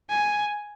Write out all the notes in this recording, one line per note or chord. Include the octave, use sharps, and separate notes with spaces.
G#5